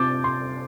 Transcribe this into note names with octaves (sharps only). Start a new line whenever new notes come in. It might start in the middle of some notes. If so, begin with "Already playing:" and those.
Already playing: C3 F4 D6 G6 A6
C3 C6